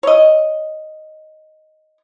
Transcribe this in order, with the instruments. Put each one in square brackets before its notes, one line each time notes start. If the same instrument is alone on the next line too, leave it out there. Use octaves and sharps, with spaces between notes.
[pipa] C#5 D#5